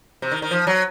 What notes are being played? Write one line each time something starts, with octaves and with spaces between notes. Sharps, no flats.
C3
D#3
D#3
F3
F#3